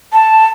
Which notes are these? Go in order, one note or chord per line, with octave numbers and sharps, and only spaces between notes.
A5